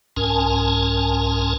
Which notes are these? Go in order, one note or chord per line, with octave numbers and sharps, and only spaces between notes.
C2 G#2 C#4 A#4 G#5 A5